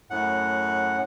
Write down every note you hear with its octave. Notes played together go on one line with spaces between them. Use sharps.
F#2 A2 F#5